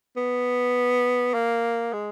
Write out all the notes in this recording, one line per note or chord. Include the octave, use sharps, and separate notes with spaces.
B3
A#3
G#3